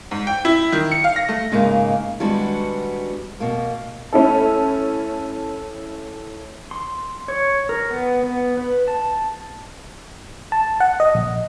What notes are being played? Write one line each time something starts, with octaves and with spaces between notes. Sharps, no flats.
G#2
G5
E4
D#3
C#7
F5
A#6
A3
G#2 C#3 A#3 D#4 G#4
D#3 G3 G#3 B3 D4 F#4
B2 A#3
A3 C#4 E4 A4
C6
C#5
A#4
B3
B3
B4
A5
A5
F#5
D#5
A#1